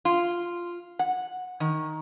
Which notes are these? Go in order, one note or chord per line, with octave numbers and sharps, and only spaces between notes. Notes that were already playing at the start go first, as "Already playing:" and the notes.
F4
F#5
D#3